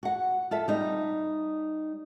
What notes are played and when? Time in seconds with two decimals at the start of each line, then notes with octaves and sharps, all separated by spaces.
0.03 F#4 F#5
0.51 F4 A4 E5
0.68 G3 D#4